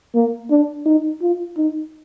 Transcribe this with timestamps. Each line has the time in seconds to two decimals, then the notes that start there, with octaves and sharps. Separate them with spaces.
0.15 A#3
0.50 D4
0.86 D#4
1.22 F4
1.57 D#4